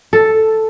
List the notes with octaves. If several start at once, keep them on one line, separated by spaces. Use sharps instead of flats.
A4